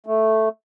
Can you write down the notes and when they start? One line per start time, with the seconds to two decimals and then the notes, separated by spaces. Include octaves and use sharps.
0.06 A3